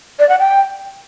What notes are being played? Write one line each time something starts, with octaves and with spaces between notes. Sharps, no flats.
D5
F#5
G5